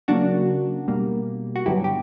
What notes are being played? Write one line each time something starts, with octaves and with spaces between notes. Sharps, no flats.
C#3 F#3 A#3 D4 F#4
B2 G3 A#3
F#4
G2 D3 F#3 B3 E4 G4
G4